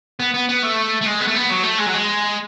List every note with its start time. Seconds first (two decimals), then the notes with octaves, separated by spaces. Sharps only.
0.20 B3
0.34 B3
0.49 B3
0.63 A3
1.02 A3
1.06 G#3
1.21 B3
1.28 A3
1.35 B3
1.50 F#3
1.63 A3
1.78 G#3
1.86 F#3
1.94 G#3